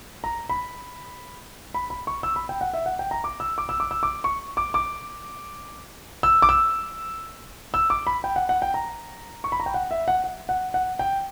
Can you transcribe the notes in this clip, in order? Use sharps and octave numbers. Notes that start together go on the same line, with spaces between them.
A#5
B5
B5
B5
C#6
E6
B5
G5
F#5
E5
F#5
G5
A#5
D6
E6
D6
E6
D6
E6
D6
C#6
D6
D6
E6
D6
E6
E6
D6
B5
G5
F#5
F#5
G5
A#5
C#6
B5
A#5
G5
F#5
E5
F#5
F#5
F#5
F#5
G5